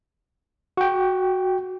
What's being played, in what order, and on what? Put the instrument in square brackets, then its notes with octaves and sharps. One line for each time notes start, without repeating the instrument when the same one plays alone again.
[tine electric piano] F#4 G5